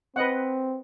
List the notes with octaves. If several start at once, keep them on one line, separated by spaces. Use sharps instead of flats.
C4 B4 D#5 F#5